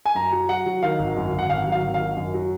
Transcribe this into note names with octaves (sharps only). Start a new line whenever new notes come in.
G#5
F#2 A#5
F#3
F#3 F#5
F#3
D#3 F5
G#1
F#2
G#1
F#5
G#1 F5
F#3
F5
G#1
F5
D#3
F#2
F#3